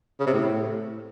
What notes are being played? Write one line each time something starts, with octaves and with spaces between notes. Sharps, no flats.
C#3
C3
A2